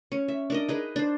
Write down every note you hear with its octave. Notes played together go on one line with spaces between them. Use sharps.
C#4
E5
D4 A#4 D#5
D#4 G#4 B4
D4 C5